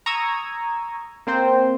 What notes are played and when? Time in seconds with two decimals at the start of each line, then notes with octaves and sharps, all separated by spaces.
0.06 A#5 C#6 D#6 E6 G#6
1.27 A#3 C4 C5 G5